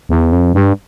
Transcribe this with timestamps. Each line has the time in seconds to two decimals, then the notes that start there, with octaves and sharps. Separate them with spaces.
0.09 E2
0.32 F2
0.54 G2